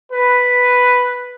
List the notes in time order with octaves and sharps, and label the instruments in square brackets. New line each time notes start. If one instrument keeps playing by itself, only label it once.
[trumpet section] B4